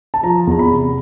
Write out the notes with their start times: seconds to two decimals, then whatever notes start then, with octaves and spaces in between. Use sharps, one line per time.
0.14 A5
0.23 F3 A#5
0.47 E2 A#5
0.59 B5
0.71 C3